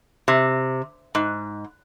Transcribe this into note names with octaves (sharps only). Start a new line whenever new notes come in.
C3
G#2